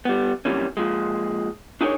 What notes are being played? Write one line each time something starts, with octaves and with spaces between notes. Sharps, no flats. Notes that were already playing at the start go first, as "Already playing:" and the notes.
G3 B3
F#2 C3 E3 G3 A#3 C#4
A#2 F3 G#3
D4 D#4 G#4 A#4 C#5